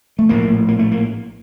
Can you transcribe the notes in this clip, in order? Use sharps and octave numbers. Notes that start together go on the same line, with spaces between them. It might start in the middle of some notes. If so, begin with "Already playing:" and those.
A3
A#1 A2 A#3
A#3
A3
A#3